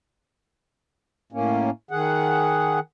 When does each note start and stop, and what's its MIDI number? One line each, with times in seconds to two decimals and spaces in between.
1.32 1.70 45
1.32 1.70 58
1.32 1.70 61
1.91 2.79 51
1.91 2.79 68
1.91 2.79 78